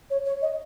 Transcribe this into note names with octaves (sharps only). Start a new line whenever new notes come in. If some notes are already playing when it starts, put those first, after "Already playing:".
C#5
C#5
D#5